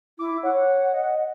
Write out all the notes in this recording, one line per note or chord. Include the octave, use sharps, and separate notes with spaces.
E4 D6
C#5 F#5
D#5